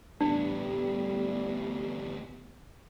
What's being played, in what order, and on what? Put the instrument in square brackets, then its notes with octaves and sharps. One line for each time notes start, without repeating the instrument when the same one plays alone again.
[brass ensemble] A1 G3 [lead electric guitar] D2 B3 [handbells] D4